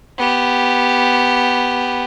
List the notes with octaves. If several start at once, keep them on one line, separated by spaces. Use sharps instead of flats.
B3 G4